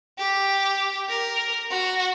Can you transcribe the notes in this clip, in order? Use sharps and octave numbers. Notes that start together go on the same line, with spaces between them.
G4
A#4
F#4